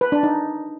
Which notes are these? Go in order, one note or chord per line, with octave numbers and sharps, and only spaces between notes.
B4
D4
D#4